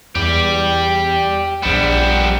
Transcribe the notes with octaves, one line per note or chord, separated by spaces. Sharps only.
E2 G4 D5
A#1 G3 B3 E7